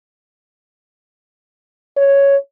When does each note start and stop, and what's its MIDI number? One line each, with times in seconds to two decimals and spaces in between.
1.97 2.36 73